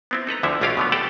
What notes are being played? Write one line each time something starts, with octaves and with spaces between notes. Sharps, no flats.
B3 C4 E4
D#4 A4 B4 A#5
D2 D3 F3 E4 C5 E5
B1 A3 C#4 F4 G4 F5
B2 D3 B3
G4 A4 D5 F#5 G5 A5